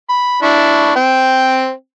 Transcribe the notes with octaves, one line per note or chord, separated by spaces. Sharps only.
B5
D4 E4 C#6
C4 G5